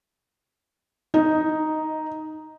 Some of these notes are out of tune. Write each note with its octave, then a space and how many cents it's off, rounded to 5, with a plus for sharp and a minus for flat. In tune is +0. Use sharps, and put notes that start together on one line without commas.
D#4 +0 D#5 +15